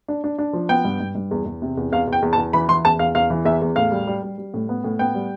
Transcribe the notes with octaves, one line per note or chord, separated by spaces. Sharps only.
D4
D4
D4
F3
B3 G5
G2
G2
G2
E2
E2
C3
E2
E2 F5
E2
G5
E2
A5
E2
E3 B5
E3 C6
E2 A5
E2 F5
E2 F5
E3
E2 E5
E2
A2 F5
G3
G3
G3
G3
A2
B3
A2
B3 G5
G3